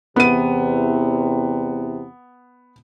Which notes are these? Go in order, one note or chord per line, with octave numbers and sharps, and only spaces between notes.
E2 C3 B3 D#7